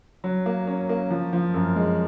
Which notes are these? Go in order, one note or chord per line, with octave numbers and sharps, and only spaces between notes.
F#3
A#3
C#4
A#3
F3
F3
F#2
G#3